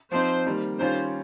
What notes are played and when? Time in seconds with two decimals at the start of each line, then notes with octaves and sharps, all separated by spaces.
0.12 F3 C4 D#4 C5
0.46 D#3 G3 A#3
0.79 D#3 G3 C#4 F4 C5